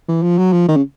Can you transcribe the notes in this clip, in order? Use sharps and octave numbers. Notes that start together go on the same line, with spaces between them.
E3
F3
F#3
F3
D#3
C#3